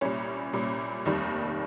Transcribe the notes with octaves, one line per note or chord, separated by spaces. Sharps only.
C2 A#2 G3 C#4
C2 A#2 G3
F1 D#2 D#3 G3